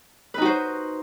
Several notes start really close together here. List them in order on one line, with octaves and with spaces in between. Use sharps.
B4 D#4 F#4 C5